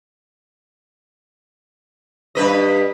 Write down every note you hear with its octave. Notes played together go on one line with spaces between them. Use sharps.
G2 B4 D#5